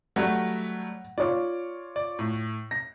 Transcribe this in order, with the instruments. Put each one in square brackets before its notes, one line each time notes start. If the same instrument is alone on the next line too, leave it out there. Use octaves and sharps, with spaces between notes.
[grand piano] F#3 G3 A3 [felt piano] F#5
[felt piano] F4 C#5 F5 [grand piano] D5
[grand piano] D5
A2
A#6